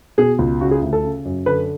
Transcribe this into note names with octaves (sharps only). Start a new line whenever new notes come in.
B2 G#4
C#2
C#3 F#4
G#4
D2
A4
C#3
F#2
D3 B4